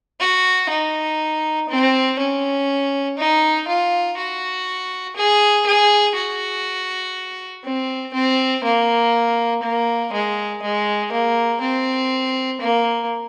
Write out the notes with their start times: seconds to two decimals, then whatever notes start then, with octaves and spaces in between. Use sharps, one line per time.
0.20 F#4
0.70 D#4
1.69 C4
2.19 C#4
3.18 D#4
3.68 F4
4.18 F#4
5.16 G#4
5.66 G#4
6.15 F#4
7.64 C4
8.14 C4
8.64 A#3
9.63 A#3
10.13 G#3
10.62 G#3
11.12 A#3
11.61 C4
12.61 A#3